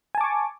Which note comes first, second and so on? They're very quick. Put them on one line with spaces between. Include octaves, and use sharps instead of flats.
G#5 A5 D6 C#6